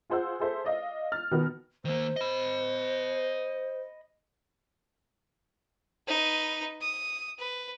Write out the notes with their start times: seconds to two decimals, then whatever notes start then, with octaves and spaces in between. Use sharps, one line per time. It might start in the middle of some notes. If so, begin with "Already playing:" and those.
0.10 F4 G#4 C5 F#5 E6
0.40 G#4 A4 C5 E5
0.64 D5 D#5 F5
1.12 F6 A6
1.31 B2 D#3 B3 F#4 A#4
1.85 D#3 A#3 C5
2.16 D#5 B5
6.07 D#4 B4
6.81 D#6
7.39 B4